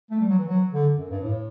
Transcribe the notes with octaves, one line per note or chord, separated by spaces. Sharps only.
A3
G3
F#3
E3
F#3
D3
F#2
G2
A2